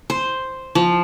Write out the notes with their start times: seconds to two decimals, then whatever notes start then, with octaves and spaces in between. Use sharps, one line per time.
0.10 C5
0.75 F3